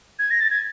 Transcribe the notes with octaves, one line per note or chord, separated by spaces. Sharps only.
G#6
A#6
A6
G#6